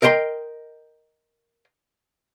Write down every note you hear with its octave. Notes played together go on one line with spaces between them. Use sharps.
A#4 D#5 G5 A#5 C6